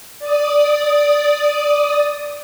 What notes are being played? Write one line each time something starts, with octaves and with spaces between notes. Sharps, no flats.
D5 D#6